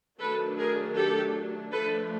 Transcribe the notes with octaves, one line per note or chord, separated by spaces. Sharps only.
D#3 F#3 A3 D4 A4 B4
G#4 A#4
G4 A4
F3 A3 D4 A4 B4